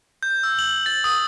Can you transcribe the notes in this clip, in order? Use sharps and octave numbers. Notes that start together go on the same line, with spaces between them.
G6
E6
F#7
A6
D#6